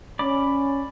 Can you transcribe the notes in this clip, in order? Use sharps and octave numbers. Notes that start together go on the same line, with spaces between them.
C#4 D5 B5 D6